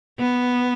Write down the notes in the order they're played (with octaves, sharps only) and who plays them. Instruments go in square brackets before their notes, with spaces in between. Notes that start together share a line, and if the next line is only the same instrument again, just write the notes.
[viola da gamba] B3